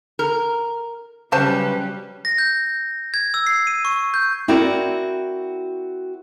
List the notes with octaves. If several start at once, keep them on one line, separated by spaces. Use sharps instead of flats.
A#4
C#3 F#3 G3 C#4 F#4 B4 C5 A5
A#6
G6
G#6
E6
C7
D#7
C#6
G6
C4 E4 F#4 A#4 D5